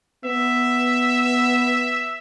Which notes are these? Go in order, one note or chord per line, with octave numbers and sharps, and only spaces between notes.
B3 E5